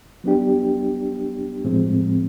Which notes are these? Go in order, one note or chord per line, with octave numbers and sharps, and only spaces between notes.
F#3 B3 D4 G4
A2 F3 G#3 C4